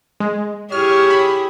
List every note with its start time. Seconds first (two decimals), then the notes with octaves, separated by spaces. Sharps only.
0.20 G#3
0.72 E4 G4 G#4 C#5 F6
1.10 B5